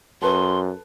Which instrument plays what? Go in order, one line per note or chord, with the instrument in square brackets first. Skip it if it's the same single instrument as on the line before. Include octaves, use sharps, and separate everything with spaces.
[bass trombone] F#2 [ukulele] A4 B4 [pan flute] C6